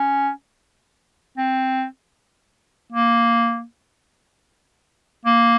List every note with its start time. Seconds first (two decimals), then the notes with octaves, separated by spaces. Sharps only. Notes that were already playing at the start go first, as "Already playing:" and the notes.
Already playing: C#4
1.38 C4
2.93 A#3
5.26 A#3